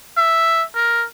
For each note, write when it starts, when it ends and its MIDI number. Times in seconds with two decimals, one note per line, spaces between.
0.17 0.64 76
0.74 1.05 70